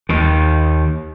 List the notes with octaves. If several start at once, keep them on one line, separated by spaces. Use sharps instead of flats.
D#2 D#3